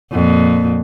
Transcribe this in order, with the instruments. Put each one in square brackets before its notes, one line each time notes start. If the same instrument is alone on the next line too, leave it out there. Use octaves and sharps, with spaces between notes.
[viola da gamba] F2 A#2